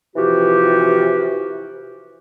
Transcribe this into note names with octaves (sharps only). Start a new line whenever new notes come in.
C3 E3 F3 F#4 G4